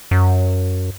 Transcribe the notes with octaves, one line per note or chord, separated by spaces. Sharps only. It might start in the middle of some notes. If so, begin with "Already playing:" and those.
F#2